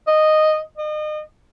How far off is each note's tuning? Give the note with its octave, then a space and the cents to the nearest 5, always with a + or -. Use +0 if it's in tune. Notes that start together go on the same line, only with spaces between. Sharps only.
D#5 -5
D#5 -35